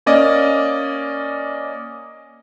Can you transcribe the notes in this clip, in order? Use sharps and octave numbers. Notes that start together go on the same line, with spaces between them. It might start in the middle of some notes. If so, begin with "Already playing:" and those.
A#3 C#4 D5 D#5